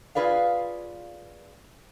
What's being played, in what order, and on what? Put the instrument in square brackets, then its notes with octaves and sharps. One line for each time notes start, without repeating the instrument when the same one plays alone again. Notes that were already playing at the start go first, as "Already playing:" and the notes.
[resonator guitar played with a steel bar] F4 G#4 B4 D5 F5